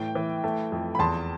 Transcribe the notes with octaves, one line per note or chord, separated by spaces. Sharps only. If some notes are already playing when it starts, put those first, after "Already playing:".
Already playing: A2 E3 G5
E3
A3
F2
B5
E2 A5 C6